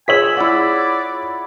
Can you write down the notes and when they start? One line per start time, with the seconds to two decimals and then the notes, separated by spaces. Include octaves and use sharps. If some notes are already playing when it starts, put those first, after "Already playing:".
0.08 F4 G#4 C#5 G#5 E6 B6 F#7
0.37 E4 D5 F#5